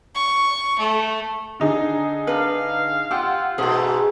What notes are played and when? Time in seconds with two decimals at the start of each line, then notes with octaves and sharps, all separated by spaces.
0.15 C#6
0.79 A3
1.60 D3 D#4 G#4
2.27 D4 B4 F5
3.11 F4 G4 F#5 E6
3.58 G#2 B2 A3 G#4 A4